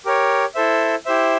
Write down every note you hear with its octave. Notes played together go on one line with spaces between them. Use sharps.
G4 A#4 C#5
E4 A4 C5 E5
E4 G4 C5 E5